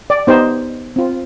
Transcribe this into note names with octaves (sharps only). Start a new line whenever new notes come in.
D5
B3 D#4 G4 C5
C4 F4